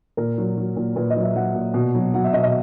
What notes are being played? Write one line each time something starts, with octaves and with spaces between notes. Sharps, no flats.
A#2 A#4
F#3
F#3
A#2
A#2 B4
D#5
F#3
E5
F#3 F#5
A#2
B2
F#3
F#3 F#5
E5
B2 D#5
D#5